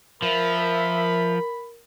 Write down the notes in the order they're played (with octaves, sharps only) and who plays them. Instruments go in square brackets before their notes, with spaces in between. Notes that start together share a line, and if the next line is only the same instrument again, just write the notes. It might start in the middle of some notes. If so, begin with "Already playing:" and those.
[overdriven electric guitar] F3 [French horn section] A#4 [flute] E5 [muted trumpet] B5